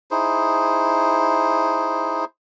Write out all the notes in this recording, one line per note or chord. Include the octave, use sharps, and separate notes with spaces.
D#4 E4 G#4 C5